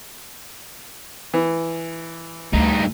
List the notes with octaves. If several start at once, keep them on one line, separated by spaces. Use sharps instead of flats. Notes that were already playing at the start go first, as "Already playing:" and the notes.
E3
D2 G2 D#4